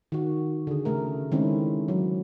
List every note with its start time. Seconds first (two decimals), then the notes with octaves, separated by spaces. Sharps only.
0.12 D#3 F#4
0.67 D3 G#4
0.85 C#3 A3 A#4
1.32 D#3 G#3 A3 C4 C#4 E4
1.88 F#3